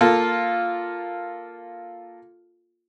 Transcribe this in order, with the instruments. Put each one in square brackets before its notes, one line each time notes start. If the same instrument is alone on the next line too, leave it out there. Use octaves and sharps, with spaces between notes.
[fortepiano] A#3 F4 A4